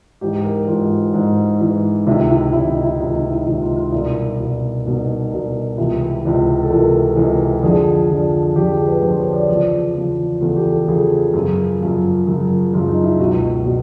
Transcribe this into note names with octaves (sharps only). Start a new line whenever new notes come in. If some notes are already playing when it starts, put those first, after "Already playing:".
G#2 E3 G4
A#4
G#2 E3 F4
G#2 E3
G#2 E3
C#2 C3 D#3 E4
E4
C#2 C3 D#3 E4
D#4
E4
C#2 C3 D#3 D#4
D#4
E4
C#2 C3 D#3 E4
F4
F4
D#4
C2 B2 E4
C2 B2
C2 B2 D#4
C2 B2
C#2 C3 E3 E4
C#2 C3 E3
A4
C#2 C3 E3 A#4
C#2 C3 E3
F2 D3 F3 G#4
F2 D3 F3
F2 D3 F3 G4
G#4
B4
F2 D3 F3 C5
C#5
D5
E2 C#3 F3 D5
E2 C#3 F3
E2 C#3 F3 A4
G4
A4
E2 C#3 F3 G#4
F#2 C#3 F3
F#2 C#3 F3
F#2 C#3 F3
F#2 C#3 F3 F4
D#4
E4
C#2 B2 F#4
B2